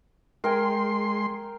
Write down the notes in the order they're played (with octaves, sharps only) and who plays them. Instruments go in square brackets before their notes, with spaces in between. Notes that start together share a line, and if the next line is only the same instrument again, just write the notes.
[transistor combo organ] G#3 C6 [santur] A#4 G5 G#5